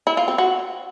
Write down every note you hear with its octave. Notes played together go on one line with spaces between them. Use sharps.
E4
F4
C4
F#4